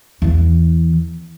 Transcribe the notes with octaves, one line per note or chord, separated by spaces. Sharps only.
E2 E3